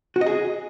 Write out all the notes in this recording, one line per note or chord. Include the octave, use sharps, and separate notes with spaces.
F#4
D#5
G#4